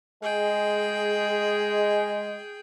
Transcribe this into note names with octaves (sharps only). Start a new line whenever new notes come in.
G#3 G#4 G5